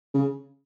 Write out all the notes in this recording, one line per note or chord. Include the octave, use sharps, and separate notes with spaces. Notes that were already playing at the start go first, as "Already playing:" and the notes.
C#3